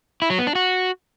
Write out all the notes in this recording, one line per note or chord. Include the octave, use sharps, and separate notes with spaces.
E4
F#3
B3
D4
F#4